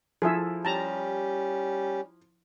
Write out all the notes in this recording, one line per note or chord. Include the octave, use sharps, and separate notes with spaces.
F3 E4 G#4 A4 E5
G3 C#4 G4 A5 A#5